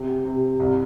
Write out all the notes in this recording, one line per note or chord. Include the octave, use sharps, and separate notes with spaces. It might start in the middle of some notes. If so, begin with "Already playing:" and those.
Already playing: C3
C3
C2